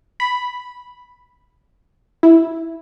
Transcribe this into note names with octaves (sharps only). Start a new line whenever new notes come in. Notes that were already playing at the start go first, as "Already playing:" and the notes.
B5
E4